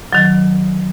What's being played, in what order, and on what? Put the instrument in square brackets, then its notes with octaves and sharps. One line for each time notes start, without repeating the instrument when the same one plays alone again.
[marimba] D#3 F#3